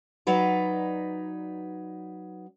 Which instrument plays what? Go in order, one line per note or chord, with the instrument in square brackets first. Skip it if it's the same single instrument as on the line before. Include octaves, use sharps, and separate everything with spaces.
[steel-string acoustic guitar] F#3 D#4 B4 D5